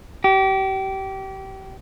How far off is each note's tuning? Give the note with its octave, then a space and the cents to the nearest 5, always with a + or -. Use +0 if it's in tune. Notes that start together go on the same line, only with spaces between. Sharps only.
G4 -30